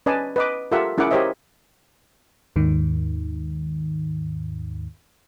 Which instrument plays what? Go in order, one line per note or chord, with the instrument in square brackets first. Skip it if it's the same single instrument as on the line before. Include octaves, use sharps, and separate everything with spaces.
[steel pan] C#4 B4 D5 D#5 G#5 A5
B4 D#5 D6
F4 G4 A4 A#4 E5 F#5
C#4 E4 G#4 A#4 F#5 D6
G4 A#4 C5 C#5 D#5 E5
[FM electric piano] D#2 G#2 D#3